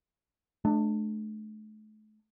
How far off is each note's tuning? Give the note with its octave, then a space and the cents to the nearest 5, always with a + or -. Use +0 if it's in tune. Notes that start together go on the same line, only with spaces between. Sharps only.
A3 -40 D4 +20